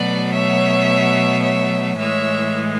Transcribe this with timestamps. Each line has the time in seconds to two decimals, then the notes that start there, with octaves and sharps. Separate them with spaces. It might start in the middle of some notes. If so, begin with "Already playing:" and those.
Already playing: B2 F#3 A3 B4 D5
0.32 C#5 E5
1.42 C#5 E5
1.97 A2 E3 G#3 C#5 E5